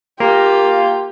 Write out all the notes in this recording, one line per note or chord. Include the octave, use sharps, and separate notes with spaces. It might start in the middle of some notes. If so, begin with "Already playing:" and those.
A#3 F4 G4